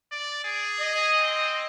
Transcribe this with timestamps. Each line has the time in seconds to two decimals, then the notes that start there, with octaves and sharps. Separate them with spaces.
0.12 D5
0.44 G#4
0.79 D#5
1.19 C4